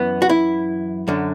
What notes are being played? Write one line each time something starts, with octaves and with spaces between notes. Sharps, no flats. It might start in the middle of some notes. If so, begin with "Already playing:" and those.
Already playing: F#2 E3 B3
F#4
E4
F#2 D3